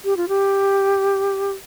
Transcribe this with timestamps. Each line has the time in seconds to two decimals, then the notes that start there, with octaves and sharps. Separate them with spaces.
0.05 G4
0.17 F4
0.28 G4